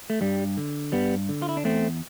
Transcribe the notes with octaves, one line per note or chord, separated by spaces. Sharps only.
A3
G2 G3
D3
G2 G3 B3
D3
F4
E4
D4
E2 A3 C4